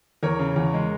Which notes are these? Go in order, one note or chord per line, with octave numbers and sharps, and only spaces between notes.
E2 A#4 C#5
C#3
E2
G#3